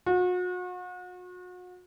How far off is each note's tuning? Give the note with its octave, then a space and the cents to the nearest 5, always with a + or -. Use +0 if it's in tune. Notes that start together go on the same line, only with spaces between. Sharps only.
F#4 -40